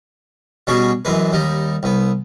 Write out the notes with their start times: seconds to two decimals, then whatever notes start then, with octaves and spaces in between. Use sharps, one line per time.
0.67 B2 G3 C#4 F#4 G#4
1.05 F#2 E3 G#3 B4
1.32 D#2 G3 D#4
1.83 C2 B3